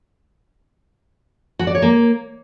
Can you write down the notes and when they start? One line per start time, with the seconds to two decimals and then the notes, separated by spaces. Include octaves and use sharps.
1.59 F#4
1.67 D5
1.75 C#5
1.82 A#3